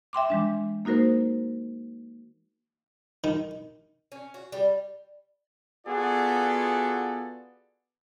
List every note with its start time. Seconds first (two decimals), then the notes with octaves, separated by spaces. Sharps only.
0.13 E5 G5 C6 D6
0.30 E3 G#3 D4
0.85 A#3 D#4 F#4 A#4 C5
3.24 D#3
4.12 C#4
4.34 F#4
4.52 G3
5.86 B3 F4 F#4 G#4 A4 D5